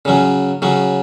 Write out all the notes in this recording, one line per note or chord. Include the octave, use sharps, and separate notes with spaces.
C#3 F#3 C#4
C#3 F#3 C#4